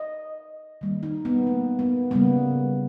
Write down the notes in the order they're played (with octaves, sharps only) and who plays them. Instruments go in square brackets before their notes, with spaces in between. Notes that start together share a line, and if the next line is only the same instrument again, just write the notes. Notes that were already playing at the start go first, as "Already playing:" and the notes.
Already playing: [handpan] D#5
D#3 G3 A#3
D#4
B3
A#3
B3
C#3 G3 A#3 B3